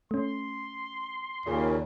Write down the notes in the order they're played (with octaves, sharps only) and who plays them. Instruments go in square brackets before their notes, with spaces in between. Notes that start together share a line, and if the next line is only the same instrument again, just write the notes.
[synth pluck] A3 C#4 [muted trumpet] C6
[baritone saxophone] D#2 [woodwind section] A#2 C#3